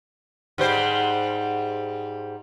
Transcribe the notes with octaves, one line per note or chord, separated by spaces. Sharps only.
G#2 G3 C5